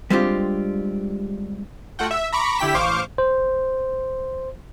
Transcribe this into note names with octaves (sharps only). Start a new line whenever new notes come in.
G3 G#3 C4 D4 F4 G4
A3 F4 F#4 F#5 G5
E5
A#5 B5 C#6 D6
D3 E4 G4 G5 B6 E7
A1 C5 F5 C#6 D6
C5